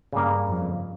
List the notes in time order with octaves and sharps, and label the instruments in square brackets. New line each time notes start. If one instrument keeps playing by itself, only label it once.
[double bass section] G2 [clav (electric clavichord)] C#3 G3 A#3
[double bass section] F2